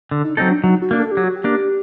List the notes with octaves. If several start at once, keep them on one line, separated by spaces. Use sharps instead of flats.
D3
D#4
F#3 C4 D#4 A4
D4
F#3 D#4
F#4
A#3 D4
A4
G4
F#3
F#4
G4
A#3 D4